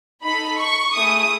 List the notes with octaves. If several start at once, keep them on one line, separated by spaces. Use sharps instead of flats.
D#4 A4 B5
C#6
A3 E4 G#4 D#6